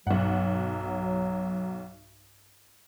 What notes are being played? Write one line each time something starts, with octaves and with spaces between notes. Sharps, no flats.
B1 G2 F#3 F#5